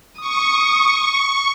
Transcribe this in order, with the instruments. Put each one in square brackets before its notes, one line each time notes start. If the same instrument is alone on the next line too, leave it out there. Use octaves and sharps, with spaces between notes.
[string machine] C#6 [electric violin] D#6